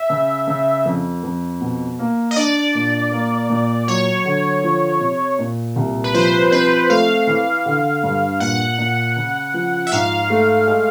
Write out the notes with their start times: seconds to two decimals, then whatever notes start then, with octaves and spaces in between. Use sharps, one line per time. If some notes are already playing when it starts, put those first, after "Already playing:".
Already playing: E5
0.10 C#3
0.47 C#3
0.85 F2
1.23 F2
1.61 B2
1.99 A#3
2.31 D#5
2.36 D4 D5
2.75 A#2
3.12 A#3
3.49 A#2
3.87 F#3 C#5
4.25 D3
4.64 F3
5.00 C3
5.39 A#2
5.76 C2
6.04 B4
6.14 F3 C5
6.51 C4 B4
6.89 A3 F5
7.27 E3
7.66 D3
8.03 G2
8.40 A#2 F#5
8.78 A#2
9.16 C#3
9.54 F3
9.87 E5
9.92 G#2 F5
10.30 A3
10.68 G#3